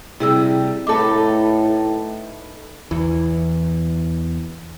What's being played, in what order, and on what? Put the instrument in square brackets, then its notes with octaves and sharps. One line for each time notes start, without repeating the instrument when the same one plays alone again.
[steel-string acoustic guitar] C3 G3 [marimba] E4 G#4 E6
[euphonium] A2 [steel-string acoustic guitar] D#4 A4 B4 [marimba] A5 D6
[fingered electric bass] E2 E3